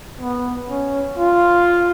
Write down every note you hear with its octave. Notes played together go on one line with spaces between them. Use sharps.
B3
C#4
F4